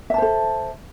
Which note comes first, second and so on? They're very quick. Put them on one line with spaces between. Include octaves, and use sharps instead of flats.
E5 A5 C5 A4